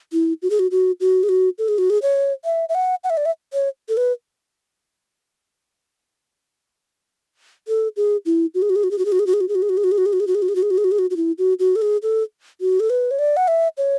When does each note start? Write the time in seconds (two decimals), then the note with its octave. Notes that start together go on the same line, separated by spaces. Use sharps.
0.13 E4
0.42 F#4
0.50 G#4
0.59 F#4
0.71 F#4
1.00 F#4
1.23 G#4
1.29 F#4
1.58 A4
1.68 G#4
1.78 F#4
1.90 G#4
2.02 C#5
2.45 E5
2.69 E5
2.75 F#5
3.04 F#5
3.10 E5
3.17 D5
3.26 E5
3.53 C#5
3.89 A4
3.97 B4
7.68 A4
7.97 G#4
8.26 E4
8.55 F#4
8.62 G#4
8.70 F#4
8.76 G#4
8.84 F#4
8.91 G#4
8.98 F#4
9.05 G#4
9.12 F#4
9.19 G#4
9.27 F#4
9.34 G#4
9.41 F#4
9.49 G#4
9.55 F#4
9.62 G#4
9.69 F#4
9.77 G#4
9.84 F#4
9.92 G#4
9.98 F#4
10.06 G#4
10.13 F#4
10.20 G#4
10.27 F#4
10.35 G#4
10.42 F#4
10.49 G#4
10.55 F#4
10.63 G#4
10.71 F#4
10.78 G#4
10.84 F#4
10.92 G#4
10.99 F#4
11.10 F#4
11.17 E4
11.38 F#4
11.59 F#4
11.76 A4
11.82 G#4
12.03 A4
12.61 F#4
12.80 A4
12.90 B4
13.11 C#5
13.19 D5
13.37 F#5
13.48 E5
13.77 C#5